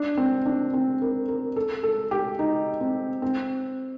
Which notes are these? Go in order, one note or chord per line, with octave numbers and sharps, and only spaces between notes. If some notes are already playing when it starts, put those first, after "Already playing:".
Already playing: D4
C4
D4
C4
A#4
A#4
A4
A4
G4
D#4
C4
C4